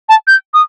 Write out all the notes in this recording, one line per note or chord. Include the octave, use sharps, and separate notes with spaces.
A5
G6
D#6